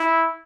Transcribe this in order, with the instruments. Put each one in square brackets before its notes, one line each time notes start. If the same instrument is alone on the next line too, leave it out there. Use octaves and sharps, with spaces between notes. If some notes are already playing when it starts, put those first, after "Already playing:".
Already playing: [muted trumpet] E4